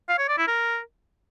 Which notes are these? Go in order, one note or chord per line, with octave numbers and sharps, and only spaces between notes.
F5
C#5
D5
E4
A#4